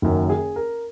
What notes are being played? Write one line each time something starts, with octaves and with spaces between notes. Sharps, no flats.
F#1 F#2 D#3 F#4
G#4
A#4